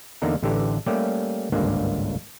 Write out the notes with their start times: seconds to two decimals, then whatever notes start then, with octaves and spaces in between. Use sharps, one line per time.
0.22 E2 D3 A#3 D#4 A#5
0.43 A1 D3 E3 G4 A4 A#5
0.86 G3 A3 A#3 C#4 G4
1.52 G#1 C#2 G2 D3 A#3 G#5